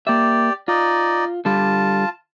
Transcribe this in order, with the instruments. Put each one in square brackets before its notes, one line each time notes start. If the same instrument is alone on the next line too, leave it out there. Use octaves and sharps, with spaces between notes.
[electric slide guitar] A#3 E5 [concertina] G4 D5
[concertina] D#4 D5 D#5 [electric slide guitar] F4
[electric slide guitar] D3 G3 [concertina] F4 A5